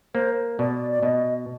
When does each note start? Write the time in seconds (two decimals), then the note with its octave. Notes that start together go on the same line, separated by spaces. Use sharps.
0.15 A#3 C5
0.59 B2 D5
0.91 D5
1.03 B2 D#5